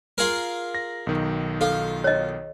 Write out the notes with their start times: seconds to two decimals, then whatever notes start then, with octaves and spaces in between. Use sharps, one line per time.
0.18 F4 G#4 A#4
0.75 A#6
1.07 B1 D#3
1.61 F4 A4
2.04 C#5 D#5